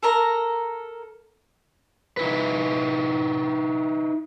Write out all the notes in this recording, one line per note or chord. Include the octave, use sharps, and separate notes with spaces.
A4 A#4 A#5
D#4 E4 B4